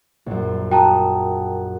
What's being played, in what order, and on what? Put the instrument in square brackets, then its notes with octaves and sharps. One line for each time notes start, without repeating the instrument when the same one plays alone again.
[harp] A#1 F#2
[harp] F#4 D#6 [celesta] G5 A5 A#5